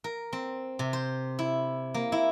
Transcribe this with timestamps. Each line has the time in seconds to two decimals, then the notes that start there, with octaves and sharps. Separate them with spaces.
0.04 A#4
0.33 C4
0.79 C3
0.93 C5
1.39 E4
1.94 A#3
2.12 E4